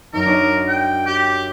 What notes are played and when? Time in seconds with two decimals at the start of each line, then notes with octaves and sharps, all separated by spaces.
0.13 F#2 D#4 A#4
0.26 D4 C#5 D#5
0.68 G5
1.06 G4